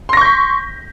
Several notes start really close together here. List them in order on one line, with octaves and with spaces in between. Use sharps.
C6 A#6 C#6 G6 B6